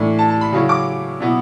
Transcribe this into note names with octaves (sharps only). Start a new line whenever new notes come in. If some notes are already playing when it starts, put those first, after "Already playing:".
Already playing: A2 E3 A3 D4
A5
A5
B5
C#3 F#3 C#4 E4
D6
B2 F#3 B3 E4